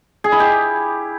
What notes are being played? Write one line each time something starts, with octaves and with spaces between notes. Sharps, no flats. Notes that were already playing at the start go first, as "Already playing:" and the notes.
G#4
E4
G4